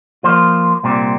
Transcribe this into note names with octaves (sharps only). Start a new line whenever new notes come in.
F3 A#3 F4 C5
C2 A#2 G3 C4